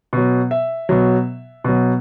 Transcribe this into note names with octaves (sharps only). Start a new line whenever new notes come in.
B2 F#3
E5
B2 F#3
B2 F#3